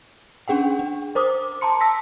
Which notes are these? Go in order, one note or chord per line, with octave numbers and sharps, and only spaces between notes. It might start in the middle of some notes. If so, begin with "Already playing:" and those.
C#4 D4 G#4 F#5 G5
D4
A#4 C5 D6 D#6
A5 A#5 C6 C#7
A5 E6 A#6 B6